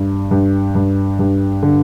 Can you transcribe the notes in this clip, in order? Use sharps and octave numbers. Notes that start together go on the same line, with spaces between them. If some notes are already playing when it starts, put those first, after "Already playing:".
Already playing: G2
G2
G2
G2
D3